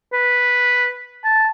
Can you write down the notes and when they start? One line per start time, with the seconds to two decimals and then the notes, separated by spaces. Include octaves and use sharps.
0.13 B4
1.24 A5